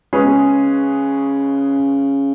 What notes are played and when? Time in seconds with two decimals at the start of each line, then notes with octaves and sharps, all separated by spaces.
0.13 C#3 G#3 C#4 G#4 B4
0.22 B2
0.32 C#3